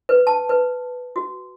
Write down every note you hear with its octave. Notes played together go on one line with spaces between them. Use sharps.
B4
A5
B4
F#4